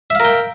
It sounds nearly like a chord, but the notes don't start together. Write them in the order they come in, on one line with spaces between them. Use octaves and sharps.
E5 F5 A#4 G5